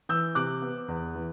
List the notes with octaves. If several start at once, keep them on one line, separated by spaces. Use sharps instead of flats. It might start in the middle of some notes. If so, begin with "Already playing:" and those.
E3 E6 G6
C3 D6 F#6
B3
E2
E3